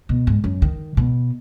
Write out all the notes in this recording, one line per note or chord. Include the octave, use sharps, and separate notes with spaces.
B2
G#2
F#2
D#3
B2